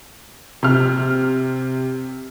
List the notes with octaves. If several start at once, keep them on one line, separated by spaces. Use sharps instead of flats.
C3 F6